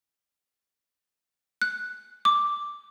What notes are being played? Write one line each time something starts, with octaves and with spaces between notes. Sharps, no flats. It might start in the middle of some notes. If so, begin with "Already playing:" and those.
F#6
D6